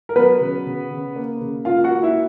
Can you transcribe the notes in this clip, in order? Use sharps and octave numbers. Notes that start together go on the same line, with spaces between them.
A#4
F#3 B3 B4
C#3
C#3
C#3
A#3
C#3
A#3 F4 F5
F#4 F#5
A#3
E4 E5